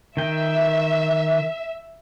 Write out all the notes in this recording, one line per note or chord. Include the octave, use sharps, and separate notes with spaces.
D#3 E5 G5